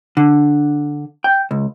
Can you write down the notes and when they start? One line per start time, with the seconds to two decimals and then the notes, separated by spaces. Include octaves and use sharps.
0.17 D3
1.24 G5
1.51 C#2